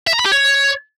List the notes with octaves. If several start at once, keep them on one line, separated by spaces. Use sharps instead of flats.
E5
A#5
B5
G4
C#5